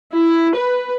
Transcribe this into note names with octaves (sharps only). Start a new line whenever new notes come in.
E4
B4